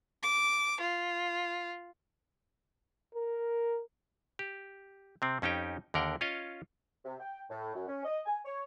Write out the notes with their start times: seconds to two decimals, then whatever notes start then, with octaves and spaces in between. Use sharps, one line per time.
0.23 D6
0.80 F4
3.16 A#4
4.39 G4
5.22 C3 C4
5.42 F2 C#4 D#4 G4 G5
5.94 D#2 D3 A#4 F#5 G5
6.21 C#4 F4 C#5 D#5 F5
7.05 C3
7.20 G5
7.50 A2
7.75 F#2
7.88 C#4
8.05 D#5
8.26 G#5
8.45 C#5